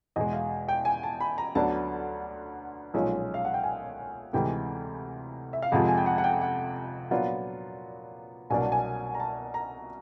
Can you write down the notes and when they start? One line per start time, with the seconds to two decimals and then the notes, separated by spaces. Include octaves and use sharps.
0.16 E2 B2 G#3 D#5
0.33 F5
0.69 G5
0.85 G#5
1.03 A5
1.21 B5
1.38 A#5
1.55 D2 D3 F#3 B3 D4 A5
2.94 B1 A#2 F3 G#3 C#4
3.34 F5
3.45 F#5
3.54 G5
3.64 G#5
4.33 D2 C3 E3 G#3 G5
5.53 E5
5.62 F5
5.72 F2 C3 F3 G#3 F#5
5.88 G#5
5.97 G5
6.06 F#5
6.18 F#5
6.24 G5
6.41 F#5
7.11 A#2 F#3 B3 D4 F4
8.50 C2 B2 F#3 A#3 D4 G#5
8.61 A5
8.72 G#5
9.15 A#5
9.20 A5
9.54 A#5